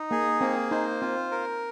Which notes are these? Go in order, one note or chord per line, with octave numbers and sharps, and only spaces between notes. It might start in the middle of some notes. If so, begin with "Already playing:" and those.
Already playing: D#4
A#3 G#4
A#3 C4
D#4 C5
C4 F4
A#4